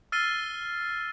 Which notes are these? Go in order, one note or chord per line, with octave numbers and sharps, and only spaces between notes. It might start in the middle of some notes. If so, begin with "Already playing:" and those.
E6 F6 A6 C7 D#7 G7